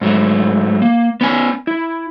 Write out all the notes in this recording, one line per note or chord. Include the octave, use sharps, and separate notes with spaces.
G#2 F#3 A3
A#3
B3 C#4 G#5
E4